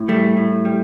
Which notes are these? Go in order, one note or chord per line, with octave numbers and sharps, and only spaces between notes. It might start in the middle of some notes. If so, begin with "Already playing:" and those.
Already playing: A2
G3 A3
A2
G3